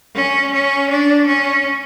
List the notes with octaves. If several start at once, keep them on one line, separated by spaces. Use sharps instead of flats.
C#4
C#4
D4
C#4